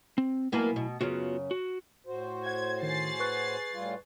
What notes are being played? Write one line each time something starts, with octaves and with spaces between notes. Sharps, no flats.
C4
B1 B2 A#3 B3 E4 G#5
B2
F#2 C#3 B3 F4 F#4
F#4
A2 F#4 C5
F#5 G#6
D#3 G#4 A6 C7
B4 C#6 F#6
A2 G3 F4